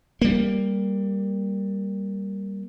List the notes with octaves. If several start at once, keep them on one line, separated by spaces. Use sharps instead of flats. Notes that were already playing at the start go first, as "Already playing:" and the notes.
G3 A#3